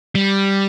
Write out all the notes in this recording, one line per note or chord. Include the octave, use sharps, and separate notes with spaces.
G3